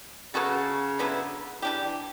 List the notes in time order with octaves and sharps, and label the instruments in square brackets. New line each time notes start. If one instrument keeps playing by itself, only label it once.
[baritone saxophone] C#3 [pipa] F#3 B3 F#4 A4
[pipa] D3 F#3 B3 E4
[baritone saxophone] E3 [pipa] G3 D4 G4
[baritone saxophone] E3